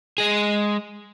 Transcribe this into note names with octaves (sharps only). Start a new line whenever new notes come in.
G#3 G#4